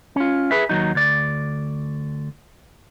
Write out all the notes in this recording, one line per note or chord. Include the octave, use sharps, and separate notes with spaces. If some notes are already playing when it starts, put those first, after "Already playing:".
C#4 F4
G#4 B4 E5
D#2 F#3 D#4
D2 D5